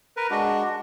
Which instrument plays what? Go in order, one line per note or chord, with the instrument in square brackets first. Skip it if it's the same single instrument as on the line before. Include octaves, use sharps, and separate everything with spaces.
[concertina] A#4 B4
[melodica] G#3 D4 [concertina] F#4